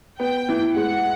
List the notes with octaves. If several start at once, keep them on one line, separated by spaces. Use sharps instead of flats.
B3 G5
E3
G#3 F#5